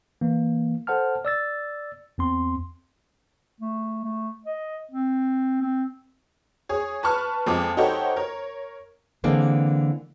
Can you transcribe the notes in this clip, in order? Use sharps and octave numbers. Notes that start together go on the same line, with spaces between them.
E3 A#3
A4 C5 F#5 A5 F6
D5 E6 A6
E2 C4 C6
A3
A3
D#5
C4
C4
G#4 C#5
B4 A5 B5 C#6 F6
F2 F3 G#3 G#5 D6
D#4 F#4 G4 A4 C5 C#5
A#4 C#5
D3 E3 G#3 A#3 C4